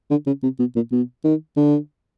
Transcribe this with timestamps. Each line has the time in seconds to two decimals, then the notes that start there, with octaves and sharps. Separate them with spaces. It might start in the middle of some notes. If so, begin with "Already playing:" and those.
0.11 D3
0.27 C#3
0.43 C3
0.59 B2
0.75 A#2
0.92 B2
1.24 D#3
1.57 D3